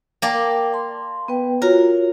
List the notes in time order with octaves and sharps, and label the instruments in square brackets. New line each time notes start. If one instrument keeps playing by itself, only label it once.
[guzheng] A#3 D5 [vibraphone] G5 A5
[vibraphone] A5 C6
B3 B4 G5
[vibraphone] F4 F#4 C#5 [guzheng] A#4